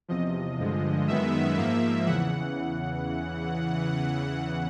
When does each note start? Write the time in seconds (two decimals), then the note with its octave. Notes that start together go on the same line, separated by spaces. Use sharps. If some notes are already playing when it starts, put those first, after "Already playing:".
0.08 E2 C3 F3 D#5
0.59 G2 D3 F3 G#3
1.08 F#2 D#3 G#3 B3 E5
1.57 G#2 F3 A#3
2.06 E2 C#3 E3 F#5